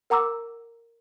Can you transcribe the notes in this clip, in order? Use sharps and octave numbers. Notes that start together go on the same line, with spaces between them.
A#4 F#5 A#5 D6 E6